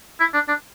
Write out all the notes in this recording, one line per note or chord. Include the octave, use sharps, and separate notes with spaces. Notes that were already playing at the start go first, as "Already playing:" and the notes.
E4
D4
D4